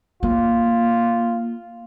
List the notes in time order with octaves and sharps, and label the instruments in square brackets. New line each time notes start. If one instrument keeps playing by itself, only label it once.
[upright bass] A#3 [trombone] F4